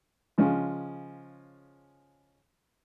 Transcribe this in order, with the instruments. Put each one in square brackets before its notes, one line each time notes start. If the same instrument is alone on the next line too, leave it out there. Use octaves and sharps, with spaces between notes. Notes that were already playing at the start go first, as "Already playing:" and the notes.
[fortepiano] C#3 F3 G#3 C#4